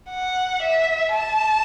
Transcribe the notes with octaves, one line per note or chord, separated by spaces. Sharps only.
F#5
E5
A5